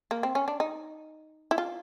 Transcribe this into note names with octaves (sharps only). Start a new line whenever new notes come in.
A#3
C4
C#4
D4
D#4
E4
F4